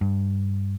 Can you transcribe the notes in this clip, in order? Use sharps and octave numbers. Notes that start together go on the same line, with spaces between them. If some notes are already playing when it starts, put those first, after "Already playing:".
G2